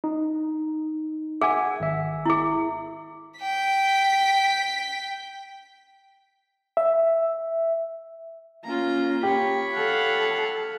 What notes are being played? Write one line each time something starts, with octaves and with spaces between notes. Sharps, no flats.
D#4
G#4 E5 F#5 G#5
G#1 E5
E4 G#4
G5 B6
E5
A#3 C#4 F4 A#5
G4 C#5 B5
A4 F5 F#5